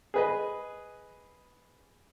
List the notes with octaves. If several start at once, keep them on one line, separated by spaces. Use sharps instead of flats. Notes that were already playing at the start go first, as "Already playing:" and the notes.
G#4 B4 D#5